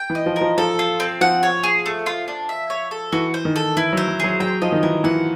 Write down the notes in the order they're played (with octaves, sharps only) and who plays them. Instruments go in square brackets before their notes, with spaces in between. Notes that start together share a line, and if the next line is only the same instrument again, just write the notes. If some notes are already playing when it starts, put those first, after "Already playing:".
Already playing: [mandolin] G5
[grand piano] E3
[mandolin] D#5
[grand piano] F3
[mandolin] A#4
[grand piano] F3
[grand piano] F3 [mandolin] A4
[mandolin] F4
C4
[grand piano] F3 [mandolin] F#5
[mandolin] C#5
G#4
A3
F4
D4
E5
C#5
A4
[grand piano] E3 [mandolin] F#4
[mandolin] C5
[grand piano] D#3
[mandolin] A4
[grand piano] E3 [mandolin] E4
[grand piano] F#3 [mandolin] C5
[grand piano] F#3
[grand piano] F#3 [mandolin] G#4
[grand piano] F#3 [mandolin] G5
[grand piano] F3 [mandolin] D#5
[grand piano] D#3
[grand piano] E3 [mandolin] A#4
[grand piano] E3 [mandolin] F#5